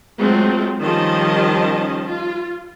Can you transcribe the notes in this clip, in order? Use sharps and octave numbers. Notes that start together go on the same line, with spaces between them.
F#3 G#3 A3 C4 F4
D#3 F3 G3 C#4 D#5 A5
F4